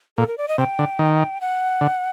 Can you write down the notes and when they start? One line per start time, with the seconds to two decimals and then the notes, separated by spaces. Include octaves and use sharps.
0.18 A#2 A4
0.28 A#4
0.38 D5
0.48 D#5
0.58 C3 G5
0.79 D3
0.99 D#3
1.41 F#5
1.81 D3